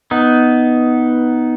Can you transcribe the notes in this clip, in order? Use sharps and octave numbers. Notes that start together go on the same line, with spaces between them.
B3 D#4